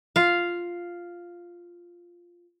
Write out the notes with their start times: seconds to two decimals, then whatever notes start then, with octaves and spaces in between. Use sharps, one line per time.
0.16 F4 F5